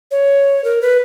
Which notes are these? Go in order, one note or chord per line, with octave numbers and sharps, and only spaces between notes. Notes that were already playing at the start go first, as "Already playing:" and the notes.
C#5
A#4
B4